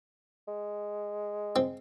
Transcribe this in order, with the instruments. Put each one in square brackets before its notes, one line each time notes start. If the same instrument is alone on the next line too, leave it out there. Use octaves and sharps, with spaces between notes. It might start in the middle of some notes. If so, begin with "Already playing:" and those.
[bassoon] G#3
[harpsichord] C4